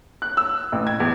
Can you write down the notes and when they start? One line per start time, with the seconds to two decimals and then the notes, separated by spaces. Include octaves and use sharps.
0.22 F#6
0.37 E6
0.72 A1
0.87 G#6
1.00 E2